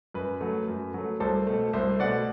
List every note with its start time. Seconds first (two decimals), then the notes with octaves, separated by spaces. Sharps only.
0.14 F#2 B4
0.41 F#3 A3
0.68 F#2
0.94 F#3 A3
1.20 C2 A4 C5
1.47 B2 A3
1.73 C2 C5 E5
2.00 B2 A3 D5 F#5